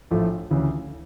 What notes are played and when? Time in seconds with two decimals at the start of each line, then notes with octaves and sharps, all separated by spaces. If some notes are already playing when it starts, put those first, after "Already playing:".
0.11 A#1 A2 F3 A3
0.51 D2 C#3 E3